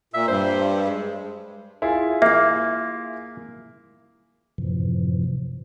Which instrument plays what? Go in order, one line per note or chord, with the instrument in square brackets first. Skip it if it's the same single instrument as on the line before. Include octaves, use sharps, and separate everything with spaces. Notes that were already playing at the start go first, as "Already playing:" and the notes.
[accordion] A#2 [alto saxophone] E5
[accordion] G2 [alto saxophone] C5
[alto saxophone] G#3
[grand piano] E4 F4 G#4
[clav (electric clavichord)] A#3 [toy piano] G4 E5
[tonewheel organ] F#2 A2 C3 E3 F3